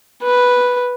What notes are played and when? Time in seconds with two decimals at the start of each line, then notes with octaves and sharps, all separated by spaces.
0.22 B4